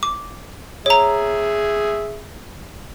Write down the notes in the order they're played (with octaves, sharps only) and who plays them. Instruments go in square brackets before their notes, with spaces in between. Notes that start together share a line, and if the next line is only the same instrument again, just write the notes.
[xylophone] D6
[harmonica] G#4 E5 [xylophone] C#5 A#5